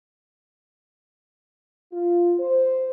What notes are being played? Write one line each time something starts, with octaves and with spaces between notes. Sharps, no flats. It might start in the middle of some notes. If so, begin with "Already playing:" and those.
F4
C5